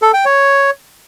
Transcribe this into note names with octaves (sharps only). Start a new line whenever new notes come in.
A4
G5
C#5